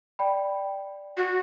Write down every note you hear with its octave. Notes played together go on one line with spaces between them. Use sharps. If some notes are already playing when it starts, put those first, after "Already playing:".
D5 G5 B5
F#4